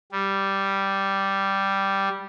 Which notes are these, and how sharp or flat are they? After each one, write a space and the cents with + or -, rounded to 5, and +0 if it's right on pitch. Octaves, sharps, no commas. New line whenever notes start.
G3 -5